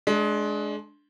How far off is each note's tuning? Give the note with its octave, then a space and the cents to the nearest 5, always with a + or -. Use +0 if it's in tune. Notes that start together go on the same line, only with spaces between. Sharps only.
G#3 +25 D4 +0